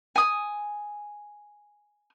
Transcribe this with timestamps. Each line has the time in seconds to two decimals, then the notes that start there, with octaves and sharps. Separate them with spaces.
0.16 G#5 D#6